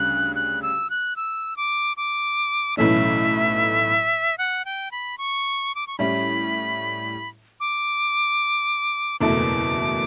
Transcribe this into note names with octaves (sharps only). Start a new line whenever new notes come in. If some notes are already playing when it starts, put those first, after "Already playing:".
Already playing: D2 C#3 G3 F#6
F#6
E6
F#6
E6
D6
D6
B1 A2 E3 A3 C#4 E5
F#5
G5
B5
C#6
D6
C#6
A2 G3 C#4 E4 B5
D6
F#1 E2 B2 A3 D6